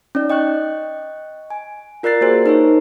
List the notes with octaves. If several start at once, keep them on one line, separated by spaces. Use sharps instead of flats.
C#4 D#4 D5
D#5 G5 C#6 F#6
G#5
F4 A#4 D5 F#6 A6 C7
A#3 F#4 G#4 C5 G#5
D#4 A#4 C5 C#5